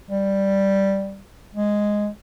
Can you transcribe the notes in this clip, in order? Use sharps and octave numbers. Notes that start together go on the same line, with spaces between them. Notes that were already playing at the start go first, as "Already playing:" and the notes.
G3
G#3